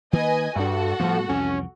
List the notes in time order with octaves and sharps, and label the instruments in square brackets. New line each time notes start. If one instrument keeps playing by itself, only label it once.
[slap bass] D#3 A#3 [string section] B4 D#5 G#5
[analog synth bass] G2 [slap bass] G3 D4 [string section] F#4 A4 F#5
[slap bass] A2 G3 B3 [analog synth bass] F3
[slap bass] C2 F2 E3 [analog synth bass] C#4